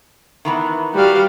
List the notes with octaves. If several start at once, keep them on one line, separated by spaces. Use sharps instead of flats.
D#3 E3 B3
G3 F#4 F5